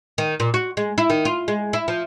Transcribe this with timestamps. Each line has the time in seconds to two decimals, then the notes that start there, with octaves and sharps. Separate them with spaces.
0.18 D#3
0.40 A#2
0.54 F#4
0.77 G#3
0.98 E4
1.10 D#3
1.25 F4
1.48 G#3
1.73 E4
1.88 F3